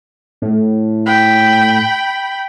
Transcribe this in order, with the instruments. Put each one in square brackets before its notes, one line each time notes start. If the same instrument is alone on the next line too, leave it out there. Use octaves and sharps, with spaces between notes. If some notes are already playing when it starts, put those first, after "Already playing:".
[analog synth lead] A2
[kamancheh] G5 B5